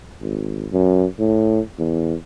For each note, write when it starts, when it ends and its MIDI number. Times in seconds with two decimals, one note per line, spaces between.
0.21 0.67 32
0.72 1.06 42
1.19 1.61 45
1.79 2.15 40